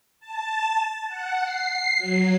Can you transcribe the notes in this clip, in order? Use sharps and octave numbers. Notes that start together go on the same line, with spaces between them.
A5
F#5
C7
F#3